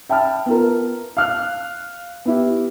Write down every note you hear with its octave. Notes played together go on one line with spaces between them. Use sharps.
E5 G5 A5 B5 F6
B3 F4 A#4
F5 F6 F#6
B3 E4 G4